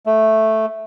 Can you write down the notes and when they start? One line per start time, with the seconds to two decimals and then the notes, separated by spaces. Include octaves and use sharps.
0.06 A3